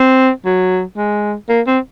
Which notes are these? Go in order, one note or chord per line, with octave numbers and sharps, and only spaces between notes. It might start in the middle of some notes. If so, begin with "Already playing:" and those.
Already playing: C4
F#3
G#3
A#3
C4